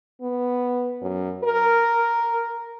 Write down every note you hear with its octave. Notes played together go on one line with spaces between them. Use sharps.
B3
F#2
A#4